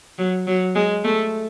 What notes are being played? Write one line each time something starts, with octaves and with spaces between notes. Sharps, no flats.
F#3
F#3
G#3
A3